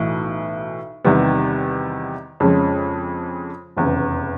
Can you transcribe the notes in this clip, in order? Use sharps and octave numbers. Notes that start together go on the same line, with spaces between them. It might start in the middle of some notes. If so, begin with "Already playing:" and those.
Already playing: B1 A2 E3
E2 C3 D#3 G3 B3
F2 C#3 F3 G#3 C#4
F1 E2 C#3